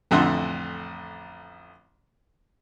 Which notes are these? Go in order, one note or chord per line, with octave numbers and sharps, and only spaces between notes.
A1 F2 D3 E5 F#5 C6